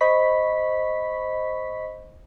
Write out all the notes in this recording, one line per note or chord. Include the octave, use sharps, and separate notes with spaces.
C5 D#5 B5 C#6 B6